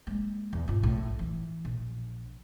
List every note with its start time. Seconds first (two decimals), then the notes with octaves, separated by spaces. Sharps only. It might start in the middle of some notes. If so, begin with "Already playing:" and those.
0.07 G#3 A#3
0.53 E2
0.68 G#2 F4
0.83 A#1 A2
1.19 E3
1.65 A#1